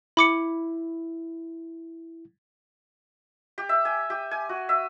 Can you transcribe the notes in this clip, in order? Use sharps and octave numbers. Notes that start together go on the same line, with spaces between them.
E4 B5 D6 C#7
G4
E5
G#5
G4
G#5
F#4
E5